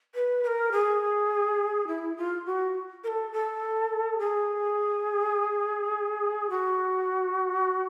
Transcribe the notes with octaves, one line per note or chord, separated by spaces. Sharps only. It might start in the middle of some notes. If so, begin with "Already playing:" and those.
B4
B4
A#4
G#4
E4
F4
F#4
A#4
A4
A4
G#4
F#4